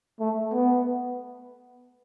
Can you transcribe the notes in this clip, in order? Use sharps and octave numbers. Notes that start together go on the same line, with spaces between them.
A3
B3